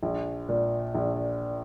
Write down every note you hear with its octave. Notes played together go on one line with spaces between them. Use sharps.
A#1
A#2
A#1